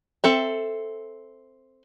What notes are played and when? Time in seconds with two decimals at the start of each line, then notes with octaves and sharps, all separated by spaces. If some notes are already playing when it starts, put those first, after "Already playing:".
0.24 C4 A4 E5